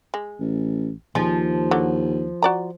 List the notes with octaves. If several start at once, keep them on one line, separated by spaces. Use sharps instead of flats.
G#3
A1
D#2 F3 G#3
D3 F#3
F#4 D5 A#5